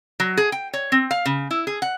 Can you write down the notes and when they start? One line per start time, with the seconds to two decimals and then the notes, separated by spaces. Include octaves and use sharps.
0.20 F#3
0.37 G#4
0.52 G5
0.73 C#5
0.92 C4
1.11 F5
1.26 C#3
1.51 E4
1.67 G#4
1.82 F#5